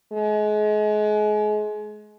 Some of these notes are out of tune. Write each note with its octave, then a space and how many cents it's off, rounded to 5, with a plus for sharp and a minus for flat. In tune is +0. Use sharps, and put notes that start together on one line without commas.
G#3 +30